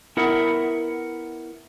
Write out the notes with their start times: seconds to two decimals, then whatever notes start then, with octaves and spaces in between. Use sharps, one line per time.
0.17 B3 E4 A#4 E5 F#5